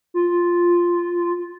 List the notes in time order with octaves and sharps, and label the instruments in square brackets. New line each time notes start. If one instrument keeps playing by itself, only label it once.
[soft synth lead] F4